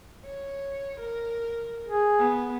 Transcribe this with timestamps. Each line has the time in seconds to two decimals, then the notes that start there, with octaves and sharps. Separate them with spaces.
0.24 C#5
1.00 A#4
1.88 G#4
2.19 B3